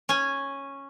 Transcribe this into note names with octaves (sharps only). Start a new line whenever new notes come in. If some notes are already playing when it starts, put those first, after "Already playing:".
C#4 G#5